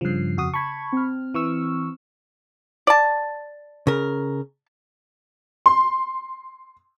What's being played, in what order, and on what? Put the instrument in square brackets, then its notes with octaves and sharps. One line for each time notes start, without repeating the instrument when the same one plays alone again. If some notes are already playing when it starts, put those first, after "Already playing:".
[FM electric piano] G2 F3 [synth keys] C#3 C7
[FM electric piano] F2 F#4 D#6
[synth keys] A5 G#6 [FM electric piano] B5 C#6
[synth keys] C4 F6
[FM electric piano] E3 C#6 E6
[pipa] D5 A5
[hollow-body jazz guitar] C#3 A#4
[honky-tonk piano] C6